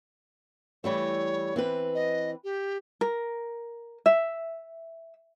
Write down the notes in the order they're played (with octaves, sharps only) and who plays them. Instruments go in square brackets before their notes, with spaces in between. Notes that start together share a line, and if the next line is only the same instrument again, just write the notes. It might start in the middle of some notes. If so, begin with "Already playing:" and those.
[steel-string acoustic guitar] E3 G3 A3 [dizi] C#5
[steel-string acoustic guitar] E3 C4 B4
[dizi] D#5
G4
[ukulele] A#4
E5